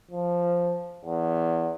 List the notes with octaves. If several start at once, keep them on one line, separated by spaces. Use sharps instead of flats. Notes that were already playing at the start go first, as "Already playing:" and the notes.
F3
E2